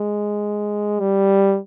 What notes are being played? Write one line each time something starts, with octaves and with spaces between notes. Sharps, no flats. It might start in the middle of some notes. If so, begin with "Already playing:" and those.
Already playing: G#3
G3